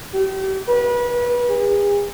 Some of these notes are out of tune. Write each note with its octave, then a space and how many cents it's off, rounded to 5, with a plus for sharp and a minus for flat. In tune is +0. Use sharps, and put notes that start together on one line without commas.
G4 -35
B4 -30
G#4 -40